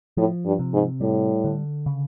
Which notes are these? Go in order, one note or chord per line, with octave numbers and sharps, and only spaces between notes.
A2 F3
G2
C3
G#2
A2 G3
D3
C#3